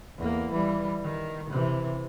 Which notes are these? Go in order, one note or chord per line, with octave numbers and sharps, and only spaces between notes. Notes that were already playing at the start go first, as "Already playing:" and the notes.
E2 A#3
E3 G3
D#3
C3 E3